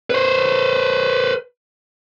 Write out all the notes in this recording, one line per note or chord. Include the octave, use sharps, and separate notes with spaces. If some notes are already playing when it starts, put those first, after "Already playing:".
B4 C5